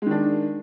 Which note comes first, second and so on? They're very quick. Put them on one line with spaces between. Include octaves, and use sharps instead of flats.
G#3 D#3 D4